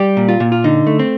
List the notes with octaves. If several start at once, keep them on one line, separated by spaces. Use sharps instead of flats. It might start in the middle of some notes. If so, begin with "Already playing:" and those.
Already playing: G3 G4
A#2
F4
A#2
F4
D3 D#4
A3
C4